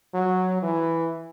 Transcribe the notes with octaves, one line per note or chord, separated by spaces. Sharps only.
F#3
E3